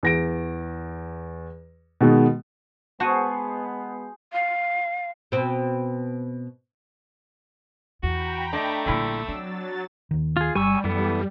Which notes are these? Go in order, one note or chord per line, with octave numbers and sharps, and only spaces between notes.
E2 A#6 D7
B2 D#3 G#3 B3
G#3 B3 F#4 G#4 C5 A5 C#7 D#7
F5
B2 C4
E2 F#4 G5 A#5 B5
A3 D4 D#5
A#1 D3 G3 B3 E4 E6
F#3 C4 D4 A6
D#2 D#3
F4 G#4
G1 G3 G#5 C#6 E6
F#2 E3 B3 A4